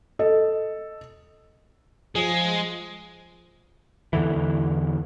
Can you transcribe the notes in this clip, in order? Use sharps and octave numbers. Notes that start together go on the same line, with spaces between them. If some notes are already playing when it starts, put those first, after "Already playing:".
A4 D#5
F3 G#3 G#4
E2 D3 E3